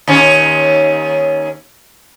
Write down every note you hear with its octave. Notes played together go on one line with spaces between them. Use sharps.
D#2 C#4